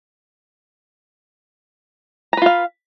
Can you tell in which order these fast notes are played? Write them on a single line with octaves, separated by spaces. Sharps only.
A#5 B4 F4 F5